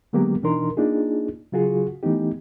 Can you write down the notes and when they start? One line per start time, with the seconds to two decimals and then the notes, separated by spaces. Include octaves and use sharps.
0.13 D3 F#3 G#3 A#3 B3 G4
0.43 B2 E3 D4 D#4 A#4 C6
0.77 A#3 D4 D#4 F4 G#4
1.52 C#3 F#3 F4 F#4 G#4
2.03 E3 A3 B3 D#4 G4